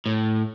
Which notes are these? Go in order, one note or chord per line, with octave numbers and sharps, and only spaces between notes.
A2